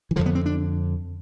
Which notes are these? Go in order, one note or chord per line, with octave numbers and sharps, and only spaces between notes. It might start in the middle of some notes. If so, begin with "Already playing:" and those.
E3
F2 D3 F3
B3
C4
D4